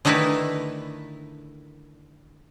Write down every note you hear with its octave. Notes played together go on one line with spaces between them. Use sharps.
D3 D#3 A3 E4 A#4 B4